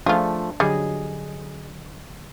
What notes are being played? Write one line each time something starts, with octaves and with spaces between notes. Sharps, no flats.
F3 A3 D4 F4 G#4
D3 F#3 G3 G#4 D#5